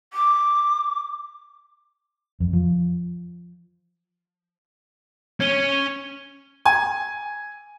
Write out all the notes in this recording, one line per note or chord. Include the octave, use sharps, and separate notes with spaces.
D6
F2
F3
C#4 C#5 G#6 D#7 G7
G#5